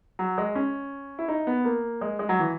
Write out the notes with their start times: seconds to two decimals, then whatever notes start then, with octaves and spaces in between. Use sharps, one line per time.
0.19 F#3
0.38 G#3
0.55 C#4
1.19 E4
1.28 D#4
1.47 B3
1.65 A#3
2.01 G#3
2.19 G#3
2.29 F#3
2.39 E3